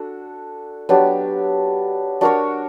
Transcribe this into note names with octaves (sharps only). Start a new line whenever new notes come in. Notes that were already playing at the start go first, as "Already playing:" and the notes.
Already playing: D4 F#4 A4
F#3 B3 D4 G4
D4 F#4 A#4 C#5